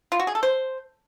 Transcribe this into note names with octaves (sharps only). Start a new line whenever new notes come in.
F4
F#4
G#4
A4
C5